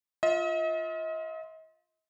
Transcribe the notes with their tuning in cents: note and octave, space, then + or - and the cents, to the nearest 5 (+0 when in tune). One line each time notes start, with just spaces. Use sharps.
F4 +0 D#5 +40